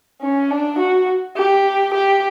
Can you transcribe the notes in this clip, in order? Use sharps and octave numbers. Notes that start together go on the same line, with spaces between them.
C#4
D4
F#4
G4
G4